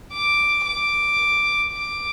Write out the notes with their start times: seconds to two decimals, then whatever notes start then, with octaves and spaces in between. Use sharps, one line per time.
0.13 D6
0.66 D6
1.73 D6